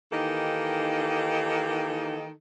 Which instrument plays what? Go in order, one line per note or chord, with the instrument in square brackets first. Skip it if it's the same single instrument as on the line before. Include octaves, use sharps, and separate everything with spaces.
[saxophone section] D#3 E3 A#3 D#4 G4 A4